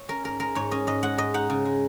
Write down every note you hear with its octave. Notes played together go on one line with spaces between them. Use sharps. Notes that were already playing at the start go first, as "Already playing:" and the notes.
Already playing: C#5
C#4 A#4
G#2 A#4
G#3 A#4
G#2 C#5
C#4 D#5
G#2 D#5
G#3 F#5
G#2 D#5
D#4 F#5
C#3
G#3